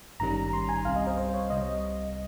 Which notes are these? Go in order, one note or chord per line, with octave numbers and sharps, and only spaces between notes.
G#1 G2 D#3 G3 C#4 A#5
C6
G#5
C2 C3 G3 F5
D#5
C5
C5
C#5
C2 C3 G3 D#5